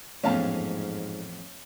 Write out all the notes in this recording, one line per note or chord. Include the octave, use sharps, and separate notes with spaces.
A1 F2 G#2 A3 B3 C#4 F5 A5